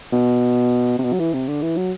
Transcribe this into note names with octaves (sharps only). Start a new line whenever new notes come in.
B2
C3
B2
F#3
E3
C3
D3
E3
F#3